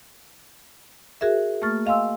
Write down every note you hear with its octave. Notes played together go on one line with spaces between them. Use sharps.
F#4 G#4 A#4 E5
A3 A#3 C#6 F6 A6
D#5 F5 G#5 C6 E6